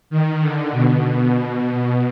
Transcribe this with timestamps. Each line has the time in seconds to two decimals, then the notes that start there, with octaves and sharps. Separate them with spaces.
0.10 D#3
0.40 D3
0.72 B2